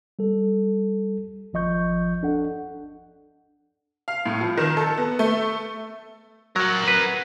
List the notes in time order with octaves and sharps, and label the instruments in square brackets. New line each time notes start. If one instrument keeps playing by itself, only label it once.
[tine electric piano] G3 A4
G#1 F3 D#5 C#6 G6
D4 A4 F#5
[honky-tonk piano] F5
A2
F3
D#3
A4
B3
A3
[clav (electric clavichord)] F#3 [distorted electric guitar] A#4 F#5
[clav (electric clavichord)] B4